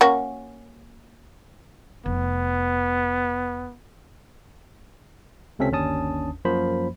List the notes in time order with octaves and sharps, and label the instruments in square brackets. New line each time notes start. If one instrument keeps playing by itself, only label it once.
[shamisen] A#3 C#4 F#4
[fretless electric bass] F1 [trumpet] B3
[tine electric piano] C#2 C3 C4 C#4 A4 B6
G1 D#2 C#4 D4 A5 D#6
F#2 F3 A#3 C5 B5